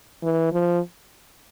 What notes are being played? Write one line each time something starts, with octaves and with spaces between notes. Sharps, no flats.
E3
F3